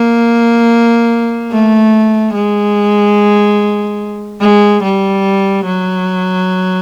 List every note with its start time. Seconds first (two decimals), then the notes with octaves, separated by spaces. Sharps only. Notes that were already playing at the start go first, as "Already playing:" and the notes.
Already playing: A#3
1.52 A3
2.34 G#3
4.41 G#3
4.83 G3
5.65 F#3